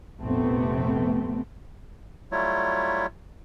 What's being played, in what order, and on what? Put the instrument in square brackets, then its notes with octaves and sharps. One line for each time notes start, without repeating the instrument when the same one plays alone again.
[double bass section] F1 A#1 C3 A3 B3 C4
[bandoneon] F#3 G3 A3 E4 F4 C#5